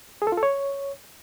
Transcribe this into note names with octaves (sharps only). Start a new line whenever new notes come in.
G#4
A4
F4
A4
C#5